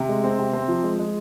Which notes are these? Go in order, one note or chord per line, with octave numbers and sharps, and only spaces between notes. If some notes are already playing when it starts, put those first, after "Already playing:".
Already playing: C3
G#3
C4
C3
C4
F3
G#3
G#3